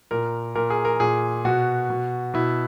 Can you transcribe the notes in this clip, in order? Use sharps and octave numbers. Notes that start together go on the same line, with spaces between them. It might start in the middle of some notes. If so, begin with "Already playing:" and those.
A#2 A#4
A#2 A#4
G#4
A#4
A#2 G#4
B2 F#4
B2
B2 E4